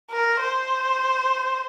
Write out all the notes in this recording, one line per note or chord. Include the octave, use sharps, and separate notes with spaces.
A#4
C5